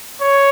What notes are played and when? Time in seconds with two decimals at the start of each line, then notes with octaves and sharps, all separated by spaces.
0.21 C#5